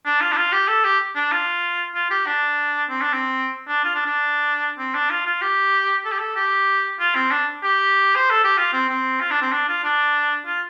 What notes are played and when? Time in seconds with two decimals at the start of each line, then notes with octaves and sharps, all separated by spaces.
0.06 D4
0.21 F4
0.32 D4
0.37 F4
0.52 G4
0.68 A4
0.84 G4
1.15 D4
1.32 F4
1.95 F4
2.10 G4
2.26 D4
2.89 C4
3.01 D4
3.13 C4
3.68 D4
3.84 F4
3.95 D4
4.05 D4
4.78 C4
4.94 D4
5.10 F4
5.26 F4
5.41 G4
6.05 A4
6.12 G4
6.19 A4
6.36 G4
6.99 F4
7.15 C4
7.31 D4
7.63 G4
8.15 C5
8.30 A4
8.44 G4
8.57 F4
8.73 C4
8.89 C4
9.20 F4
9.31 D4
9.42 C4
9.52 D4
9.68 F4
9.83 D4
10.46 F4